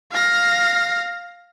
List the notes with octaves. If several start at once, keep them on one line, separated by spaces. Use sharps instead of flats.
F5 A#6